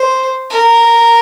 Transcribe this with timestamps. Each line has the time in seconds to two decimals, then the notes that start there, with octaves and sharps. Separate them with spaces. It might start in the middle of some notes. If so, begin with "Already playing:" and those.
Already playing: C5
0.50 A#4